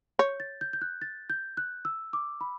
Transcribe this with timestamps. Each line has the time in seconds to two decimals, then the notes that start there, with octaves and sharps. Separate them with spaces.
0.19 C#5 G6
0.40 A6
0.61 G6
0.73 G6
0.82 F#6
1.02 A6
1.30 G6
1.57 F#6
1.85 E6
2.13 D6
2.41 B5